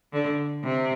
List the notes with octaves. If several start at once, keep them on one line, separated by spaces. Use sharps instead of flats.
D3
C3